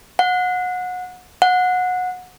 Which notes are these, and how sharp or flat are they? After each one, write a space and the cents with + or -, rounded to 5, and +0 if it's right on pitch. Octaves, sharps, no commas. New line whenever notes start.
F#5 -25
F#5 -20